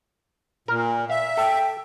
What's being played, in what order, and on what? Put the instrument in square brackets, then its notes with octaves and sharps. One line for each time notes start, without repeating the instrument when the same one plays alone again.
[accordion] A#2 [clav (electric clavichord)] A#4
[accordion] E5 [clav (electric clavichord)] F5
[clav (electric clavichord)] A4 [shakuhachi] G5